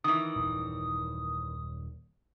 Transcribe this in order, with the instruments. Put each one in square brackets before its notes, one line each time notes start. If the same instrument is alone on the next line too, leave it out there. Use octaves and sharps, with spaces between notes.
[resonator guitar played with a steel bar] D#3 E3 [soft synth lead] D#6
[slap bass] D#1 F#2